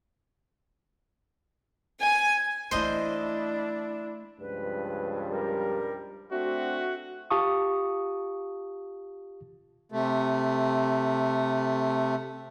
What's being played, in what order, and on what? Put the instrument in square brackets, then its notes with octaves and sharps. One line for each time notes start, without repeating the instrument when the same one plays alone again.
[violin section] G#5
[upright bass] E3 A3 [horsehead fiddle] D4 E4 [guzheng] C5 D#5
[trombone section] C#2 G2 F3 [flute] B4
[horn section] G3 [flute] A#4
[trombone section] A3 C4 D4 [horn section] F#4 [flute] E5
[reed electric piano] F4 G4 F5 A5 C#6 D#6
[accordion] C3 A3